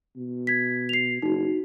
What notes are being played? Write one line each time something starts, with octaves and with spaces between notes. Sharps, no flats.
B2
G#6 B6
C7 F7
F#1 D#4 F#4